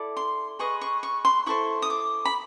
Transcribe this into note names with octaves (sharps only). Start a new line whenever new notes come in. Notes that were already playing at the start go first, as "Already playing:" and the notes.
Already playing: E4 A4 D5
C6
G#4 B4 D#5 C#6
C#6
C#6
C6
E4 A4 C5 C#6
D#6
D6
B5